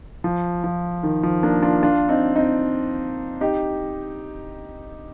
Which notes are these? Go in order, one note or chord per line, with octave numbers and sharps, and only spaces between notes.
F3
F3
D#3
F3
A#3 D4
D4 F4
D4 F4
C4 D#4
C4 D#4
D#4 G4